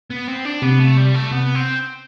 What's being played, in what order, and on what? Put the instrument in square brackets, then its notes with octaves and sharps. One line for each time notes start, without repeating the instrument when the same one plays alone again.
[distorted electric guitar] B3
C4
D4
[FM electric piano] C3 [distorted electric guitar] B3
[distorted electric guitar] A3
G3
A3
[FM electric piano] C3 [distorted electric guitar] B3
[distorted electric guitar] C4